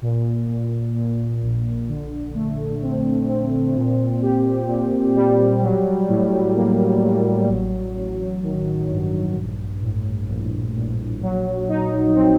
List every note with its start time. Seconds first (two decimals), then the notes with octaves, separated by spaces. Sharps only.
0.02 A#2
0.48 A#2
0.94 A#2
1.42 A#1
1.89 D3
2.35 A3
2.82 C4
3.29 C4
3.75 A#2
4.22 G4
4.68 A#2
5.15 G3
5.62 F#3
6.08 A2
6.56 A#3
7.02 F#3
7.49 A1
7.96 A1
8.43 D#3
8.89 G2
9.35 A#1
9.82 A2
10.28 A#1
10.76 A#1
11.22 F#3
11.69 D#4
12.15 C4